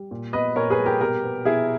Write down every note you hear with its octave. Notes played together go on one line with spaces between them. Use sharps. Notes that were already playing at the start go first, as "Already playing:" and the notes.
Already playing: G3
A#2
B3 B4 D#5
A#2 A#4 C#5
G#4 B4
G3
G4 A#4
B2 G4 A#4
B3
B2 E4 G#4